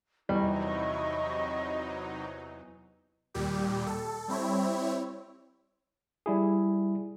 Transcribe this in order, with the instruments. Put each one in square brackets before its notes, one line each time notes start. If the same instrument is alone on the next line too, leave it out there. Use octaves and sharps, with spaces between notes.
[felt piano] E2 [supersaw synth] C3 F#3 D#4 [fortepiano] G3 [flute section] E4 D#5 C#6
[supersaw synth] D#2 A#2 G3 G4
A4
G3 C4 E4 C#5
[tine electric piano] G3 E4 G#4